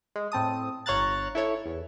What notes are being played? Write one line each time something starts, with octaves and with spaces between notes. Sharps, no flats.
G#3
A2 C4 A5 D#6
G1 C#5 F5 A#5 F#6 A6
E4 A4 C#5
E2